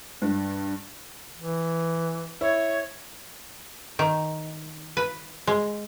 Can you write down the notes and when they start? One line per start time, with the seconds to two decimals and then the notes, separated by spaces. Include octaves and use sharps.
0.22 G2
1.38 E3
2.41 E4 C#5
3.99 D#3
4.97 B4
5.47 G#3